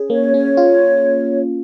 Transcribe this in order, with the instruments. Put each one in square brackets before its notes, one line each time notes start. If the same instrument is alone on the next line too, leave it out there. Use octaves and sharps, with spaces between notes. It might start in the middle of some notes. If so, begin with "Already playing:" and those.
Already playing: [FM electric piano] C#4 G#4
[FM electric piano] A#3 [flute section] C#5
[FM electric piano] C#4
F4